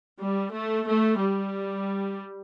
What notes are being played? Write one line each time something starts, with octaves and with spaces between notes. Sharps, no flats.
G3
A3
A3
G3